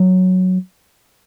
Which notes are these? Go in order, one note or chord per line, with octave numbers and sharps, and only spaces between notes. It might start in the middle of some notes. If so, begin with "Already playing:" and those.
Already playing: F#3